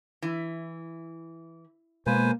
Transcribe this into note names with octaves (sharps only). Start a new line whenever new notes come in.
E3
B2 G#3 A#3 B4 C5 G#5